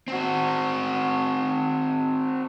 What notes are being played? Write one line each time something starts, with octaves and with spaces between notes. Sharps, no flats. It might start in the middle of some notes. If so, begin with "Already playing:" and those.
C4 F#4